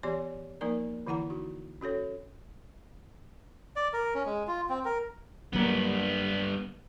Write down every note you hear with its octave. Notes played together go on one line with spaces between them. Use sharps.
E3 B3 G4 C#5 D5 C6
F3 A#3 D#4 A#4 D5 A#5
D3 E3 E4 F#5 A#5
D#4 F#4
C#4 F#4 A4 C#5
D5
A#4
C#4
G#3
F4
C4
A#4
G1 G2 F#3 A#3 B3